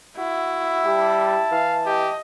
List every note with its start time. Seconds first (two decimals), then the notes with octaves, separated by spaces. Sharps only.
0.18 E4 F#4
0.86 G3 G4 A5
1.52 E3 F5
1.86 G4 D#5